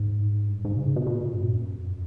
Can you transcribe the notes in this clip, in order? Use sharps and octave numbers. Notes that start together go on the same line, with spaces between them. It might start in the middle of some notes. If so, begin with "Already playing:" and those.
Already playing: G#2
G2
G#2
C3
C#3
B2
B2
A#2
G2
F#2
F2